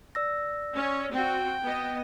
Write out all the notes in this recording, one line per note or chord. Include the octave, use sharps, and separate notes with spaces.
D5 E6 A#6
C#4
C4 F#4 G5
B3 D#5